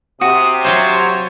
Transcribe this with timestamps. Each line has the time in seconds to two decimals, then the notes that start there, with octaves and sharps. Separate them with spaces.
0.21 C3 F#4 D#6
0.64 F#3 F4 C5 C#5